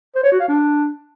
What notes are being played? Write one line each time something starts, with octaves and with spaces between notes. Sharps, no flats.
C5
C#5
F#4
F5
D4